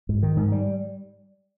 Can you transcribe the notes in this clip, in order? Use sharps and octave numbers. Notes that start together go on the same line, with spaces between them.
G#2
D#3
G#2
G3